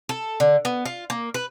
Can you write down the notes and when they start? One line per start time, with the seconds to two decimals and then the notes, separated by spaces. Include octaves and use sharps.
0.09 A4
0.40 D3
0.65 B3
0.85 F4
1.10 A#3
1.34 B4